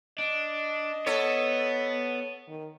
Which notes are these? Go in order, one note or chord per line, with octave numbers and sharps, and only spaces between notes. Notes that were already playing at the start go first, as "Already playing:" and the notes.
D4 D#5
B3 A4 C#5
D#3